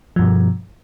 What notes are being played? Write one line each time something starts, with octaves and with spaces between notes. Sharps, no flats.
G2 B2 F3